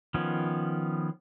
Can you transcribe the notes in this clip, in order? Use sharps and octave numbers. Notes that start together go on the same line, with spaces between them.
D#3 F3 B3 C#4